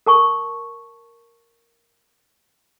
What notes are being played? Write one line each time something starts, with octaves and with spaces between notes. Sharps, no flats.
A#4 A5 C#6